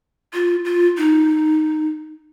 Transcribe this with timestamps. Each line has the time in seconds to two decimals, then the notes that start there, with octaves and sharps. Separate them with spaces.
0.34 F4
0.65 F4
0.97 D#4